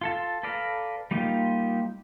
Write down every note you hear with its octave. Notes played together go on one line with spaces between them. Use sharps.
F4 A4 A5
A4 B4 D5 F5 A#5
G3 A#3 D#4 F4 G4